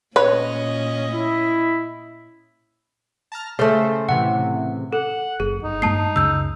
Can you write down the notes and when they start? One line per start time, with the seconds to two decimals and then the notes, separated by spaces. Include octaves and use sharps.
0.16 A#2 C#4 B4 C#5 D#5
1.12 E4
3.32 A5 A#5 F6
3.59 C#3 A3 A4 C5
4.09 A2 C3 E3 F#5
4.93 A4 F#5
5.40 F#1 G#4
5.64 G1 D#4
5.82 G2 G#3 A#3 A5 D#6 C7
6.16 C#2 F#2 C#3 E6 G6